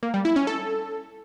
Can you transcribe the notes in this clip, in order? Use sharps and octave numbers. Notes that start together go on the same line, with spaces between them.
A#3
G3
E4
C#4
A4